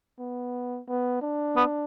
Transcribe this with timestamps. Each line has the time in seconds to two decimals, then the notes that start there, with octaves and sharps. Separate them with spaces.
0.19 B3
0.88 B3
1.22 D4
1.56 B3